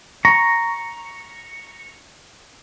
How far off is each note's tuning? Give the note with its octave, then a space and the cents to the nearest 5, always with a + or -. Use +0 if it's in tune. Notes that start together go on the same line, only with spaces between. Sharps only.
A#5 +0 C#6 +0